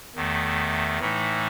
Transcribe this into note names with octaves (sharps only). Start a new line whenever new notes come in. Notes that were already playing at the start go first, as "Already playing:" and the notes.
E2 D#3 A3
A2 E3 A3 D#4